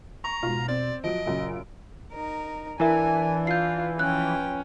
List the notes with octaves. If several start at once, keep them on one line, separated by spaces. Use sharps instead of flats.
A#5 C#6
G#2 B2 F4
C4 D5
F3 F#3 D#5 D7
F#2 A#2 C#3
D#4 A#4
E3 D4 E4 A#4 E5 G#5
F4 G6 C7
F3 C#4 B4 G5 F#6